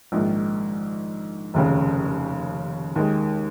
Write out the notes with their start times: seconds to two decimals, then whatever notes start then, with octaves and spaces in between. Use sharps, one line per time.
0.12 A#1 G#2 D#3
1.54 F1 D#2 C#3
2.96 D#2 D#3 G#3